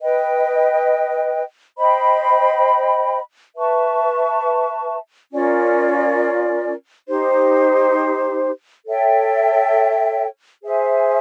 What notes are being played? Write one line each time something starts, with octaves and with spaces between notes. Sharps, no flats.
B4 D#5 G5
C5 D#5 G5 B5
B4 E5 A5 C#6
C#4 F4 A#4 D5
D#4 G4 C5
A4 C#5 E5 G5
G#4 C5 E5 G#5